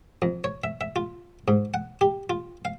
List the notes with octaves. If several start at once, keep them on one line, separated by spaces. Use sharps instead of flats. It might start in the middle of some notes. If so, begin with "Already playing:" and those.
F2
C#5
E5
E5
F4
G#2
F#5
G4
F4
F5